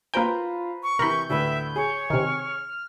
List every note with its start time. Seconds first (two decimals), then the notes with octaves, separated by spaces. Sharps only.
0.14 A#3 F4 B4 C5 G5 A#5
0.83 C#6
0.99 C3 E3 A#4 B5 G6
1.29 D2 A2 B4 E5
1.76 G#4 C#5
2.10 C3 D#3 F6